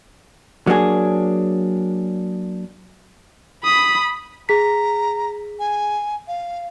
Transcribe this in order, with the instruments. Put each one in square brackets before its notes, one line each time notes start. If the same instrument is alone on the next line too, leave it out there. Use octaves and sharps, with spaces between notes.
[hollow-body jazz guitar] F#3 A#3 D4 G#4
[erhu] B5 [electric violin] D#6
[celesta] G#4 B6 [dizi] A#5
[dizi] G#5
F5